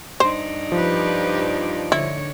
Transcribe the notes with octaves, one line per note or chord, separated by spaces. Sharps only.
G2 D#4 C5 D5
F3 G4 B4
D3 E4 C#5